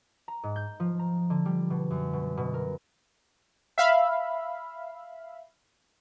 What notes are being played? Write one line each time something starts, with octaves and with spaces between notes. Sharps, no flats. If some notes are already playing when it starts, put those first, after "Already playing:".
A#5
G#2
G6
F3
A#5
D3
G3
B2
F#2
B2
B2
A#4
E5 F5 B5